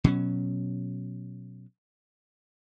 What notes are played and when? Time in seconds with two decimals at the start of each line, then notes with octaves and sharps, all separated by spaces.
0.04 B2 F#3 C#4